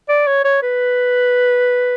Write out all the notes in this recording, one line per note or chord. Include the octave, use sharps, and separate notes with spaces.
D5
C#5
C#5
B4